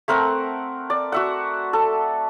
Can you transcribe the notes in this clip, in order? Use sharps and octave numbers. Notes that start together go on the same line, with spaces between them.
A3 C4 A#4 F#5
D5
F#4 E5 F#5
A4